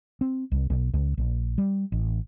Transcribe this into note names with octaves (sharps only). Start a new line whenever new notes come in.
C4
C2
B1
C#2
A#1
G3
A1